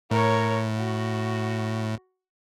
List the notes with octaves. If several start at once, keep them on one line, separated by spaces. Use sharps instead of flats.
A2 A#4 C#5
F#4